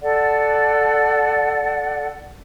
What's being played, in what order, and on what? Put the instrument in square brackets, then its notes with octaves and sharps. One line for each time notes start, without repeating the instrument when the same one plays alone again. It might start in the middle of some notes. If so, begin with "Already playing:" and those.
[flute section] A4 D5 F#5